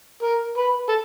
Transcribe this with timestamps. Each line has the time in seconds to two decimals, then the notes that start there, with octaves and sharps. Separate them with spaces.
0.22 A#4
0.57 B4
0.88 A4